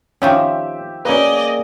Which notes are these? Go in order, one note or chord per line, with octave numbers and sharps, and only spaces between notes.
D#3 F3 C4 C#4 G4 C#5 E5
A#3 C#4 G#4 B4 D5 D#5